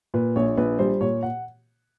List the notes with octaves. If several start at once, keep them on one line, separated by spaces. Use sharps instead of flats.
A#2 B4
A#1 C#5
A#1 B4
G3 C5
A#2 C#5
F#5